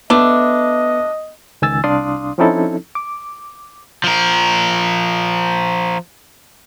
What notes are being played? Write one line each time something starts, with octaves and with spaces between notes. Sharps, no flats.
A3 B3 D4 D#5
C#2 D#3 G#5 E6 A6
C2 D4 D5 F5 C6 D#6
F3 C4 C#4 D#4 E4 A4
D6
F3 A#4